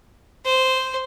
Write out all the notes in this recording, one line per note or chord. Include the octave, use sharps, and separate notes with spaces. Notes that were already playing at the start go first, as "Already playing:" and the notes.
C5